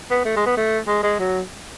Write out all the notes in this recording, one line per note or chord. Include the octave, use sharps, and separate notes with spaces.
B3
A3
G#3
B3
A3
G#3
G#3
F#3